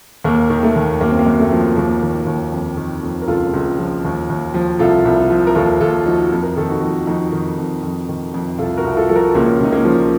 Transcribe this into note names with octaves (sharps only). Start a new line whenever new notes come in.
D#2 A#3
D#3
A3
D#2
F#2 A#3
C4
A#3
F#2
A3
F3
D#2 A#3
D#3
D#2
F2
D#3
F2
A#4
C#2 F4 A4
C#2
F3
D#2
D#2
F3
C2 F4 A4
C2
F3
A#4
D#2 F4 A4
D#2 F4 A4
F3 D#4 F#4
F2
A#4
D#3 A4
D#4 F#4
F2
F2 D#4 F#4
D#3
F2
F2
D#3
F2
C2 F4 A4
F#4 A#4
C2
F4 A4
F3 A4
F#4 A#4
C#2 A#3 C#4
C#2 D#4
A#3 C#4
F3